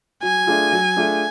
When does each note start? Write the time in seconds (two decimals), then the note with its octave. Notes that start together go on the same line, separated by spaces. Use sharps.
0.23 F#3 G#5
0.47 A3 D4 F4 G#4
0.72 F#3
0.96 A3 D4 F4 G#4